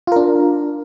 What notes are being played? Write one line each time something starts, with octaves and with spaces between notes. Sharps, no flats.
D4 F4 A#4